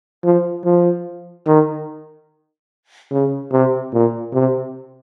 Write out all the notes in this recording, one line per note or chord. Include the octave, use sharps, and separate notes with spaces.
F3
F3
D#3
C#3
C3
A#2
C3